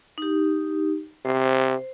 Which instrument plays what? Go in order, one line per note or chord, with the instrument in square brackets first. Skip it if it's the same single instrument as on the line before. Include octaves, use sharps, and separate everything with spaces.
[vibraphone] D#4 G4
[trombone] C3 [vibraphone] C5